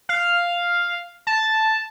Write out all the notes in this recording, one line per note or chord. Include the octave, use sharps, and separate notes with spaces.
F5
A5